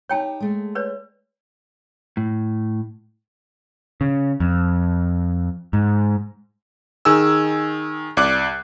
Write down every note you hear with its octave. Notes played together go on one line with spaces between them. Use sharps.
D#4 G4 C#5 G5 A5
G#3 A3
B4 C#5 D5
A2
C#3
F2
G#2
D#3 G#4 G#5 E6
C2 D5 D6 F#6